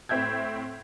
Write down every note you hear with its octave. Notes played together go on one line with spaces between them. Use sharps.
A2 C4 E5 G6 G#6